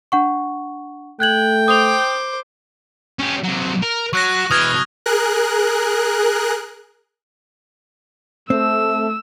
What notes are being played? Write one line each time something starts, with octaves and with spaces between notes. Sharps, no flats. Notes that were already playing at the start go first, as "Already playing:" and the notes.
D4 F#5 C#6
A3 G5 F#6 G#6 F#7
C5 D6 D#6 F7
C#4 G4
C3 F#3
A#4
F#3 C#6 F#6 A#6
B2 E3 D#6 F6 G#6
G#4 A#4 F#6
A3 C4 E6